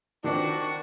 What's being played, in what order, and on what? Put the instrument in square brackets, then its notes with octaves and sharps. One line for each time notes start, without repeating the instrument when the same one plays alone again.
[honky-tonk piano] D#3 F3 C4 [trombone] D4 [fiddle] F#4